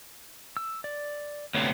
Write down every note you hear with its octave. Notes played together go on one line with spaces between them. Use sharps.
E6
D5
D2 C3 B3 C#5